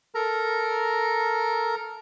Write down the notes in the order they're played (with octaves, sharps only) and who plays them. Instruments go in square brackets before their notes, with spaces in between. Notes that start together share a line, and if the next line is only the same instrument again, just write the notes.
[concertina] A4 A#4 A#5